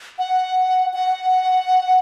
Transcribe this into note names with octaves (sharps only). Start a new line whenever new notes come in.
F#5
F#5